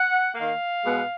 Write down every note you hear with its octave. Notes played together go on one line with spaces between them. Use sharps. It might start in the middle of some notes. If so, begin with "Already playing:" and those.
Already playing: F#5
D#3 A#3 F5
B2 G#3 B3